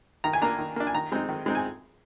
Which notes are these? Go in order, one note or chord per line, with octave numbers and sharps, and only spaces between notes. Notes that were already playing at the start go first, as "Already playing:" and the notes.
D#3 A#5
G#5
A#3 D4 A#5
D#3
A#3 D4
G#5
D#3 A#5
G#3 C4 D#4
D#3
G#3 C4 D#4
G#5